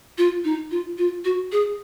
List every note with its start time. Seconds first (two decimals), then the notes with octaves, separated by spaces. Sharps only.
0.18 F4
0.44 D#4
0.71 F4
0.98 F4
1.25 F#4
1.52 G#4